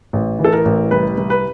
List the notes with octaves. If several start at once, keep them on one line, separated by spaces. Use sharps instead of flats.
A1
E3
A4
A#4
A1
C2 B4
C2
B4